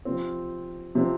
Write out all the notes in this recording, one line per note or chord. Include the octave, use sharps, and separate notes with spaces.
C3 F3 C4
C3 F3 C4